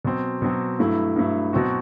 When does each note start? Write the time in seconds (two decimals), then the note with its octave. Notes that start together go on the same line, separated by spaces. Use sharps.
0.05 B2 F#3 C4
0.42 B2 F#3 C4
0.79 G2 F#3 A3 E4
1.16 G2 F#3 A3 E4
1.53 B2 F#3 C4 F#4